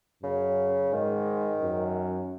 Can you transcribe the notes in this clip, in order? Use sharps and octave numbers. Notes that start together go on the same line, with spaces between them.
F#2 C#3
G#2 D#3
F#2